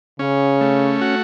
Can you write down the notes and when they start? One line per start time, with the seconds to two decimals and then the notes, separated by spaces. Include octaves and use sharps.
0.19 C#3 C#4
0.61 A3
1.01 F#4